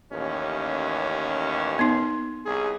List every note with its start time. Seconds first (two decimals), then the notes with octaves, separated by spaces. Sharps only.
0.12 A1 D#2 C#4
1.79 B3 D#4
2.45 C2 G#4